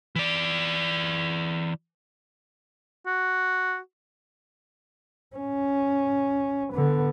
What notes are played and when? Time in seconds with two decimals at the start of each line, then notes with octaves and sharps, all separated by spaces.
0.16 E3 D5
3.07 F#4
5.36 C#4
6.73 D3 B3